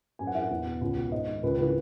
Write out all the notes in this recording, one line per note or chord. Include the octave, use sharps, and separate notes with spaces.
F#2 G#5
F#5
E3 E5
F#5
E2
B2
C#2
B2
G#2 D#5
D#3
C#2 B4
C#3 E3 B4